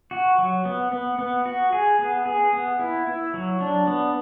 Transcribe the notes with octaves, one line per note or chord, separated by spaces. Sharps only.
F#4
F#3
B3
B3
B3
F#4
G#4
B3
G#4
B3
E4
E4
F#3
D4
B3